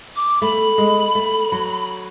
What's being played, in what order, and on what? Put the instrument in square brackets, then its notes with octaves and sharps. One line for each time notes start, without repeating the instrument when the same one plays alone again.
[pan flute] D6
[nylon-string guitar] A3 [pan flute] B5
[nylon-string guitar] G#3
A3
F#3